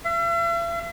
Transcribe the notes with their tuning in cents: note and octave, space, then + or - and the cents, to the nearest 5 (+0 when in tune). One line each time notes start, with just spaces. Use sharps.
E5 +45